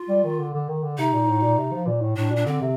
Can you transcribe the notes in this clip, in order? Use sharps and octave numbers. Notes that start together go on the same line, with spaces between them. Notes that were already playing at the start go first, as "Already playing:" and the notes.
Already playing: F4
G3
D#3
D3
D3
D#3
D3
C3 D#4
A#2
A2
A#2
C3
F3
A#2
A2
A2 D4
A#2
D4
D3 C4
C3